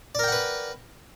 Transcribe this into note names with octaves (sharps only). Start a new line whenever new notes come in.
A#4 B4 D5 F#5 G5